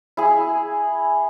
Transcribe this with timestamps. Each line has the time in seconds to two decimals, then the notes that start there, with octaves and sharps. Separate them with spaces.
0.17 E4 G#4